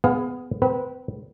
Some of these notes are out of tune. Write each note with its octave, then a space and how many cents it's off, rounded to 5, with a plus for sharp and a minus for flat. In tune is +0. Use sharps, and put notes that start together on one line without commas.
B3 +20 G#4 +0 F5 +25
C4 -35 B4 -20